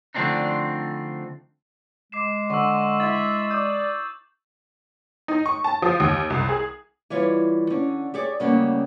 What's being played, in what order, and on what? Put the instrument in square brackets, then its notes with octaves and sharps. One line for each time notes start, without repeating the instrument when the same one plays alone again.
[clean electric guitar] D3 F3 A3 C4 D4 D#4
[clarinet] G#3 [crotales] D6 C7 E7
[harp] D3 [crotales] C#6 E6
[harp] E4 [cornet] E5 [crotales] A6 F#7
[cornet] D5 [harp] D#6 [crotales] G6
[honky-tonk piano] D#4
C#6
A5
F3
D#2
C2
G#4
[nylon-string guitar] E3 G3 F4 C#5
D3 C#4
G4 G#4 C#5 D5
D2 C#3 G3 A#3 C#4 F#4